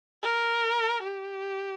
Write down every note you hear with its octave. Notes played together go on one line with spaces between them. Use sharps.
A#4
G4